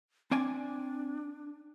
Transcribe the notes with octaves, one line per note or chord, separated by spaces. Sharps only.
C4 D4 D5 G#5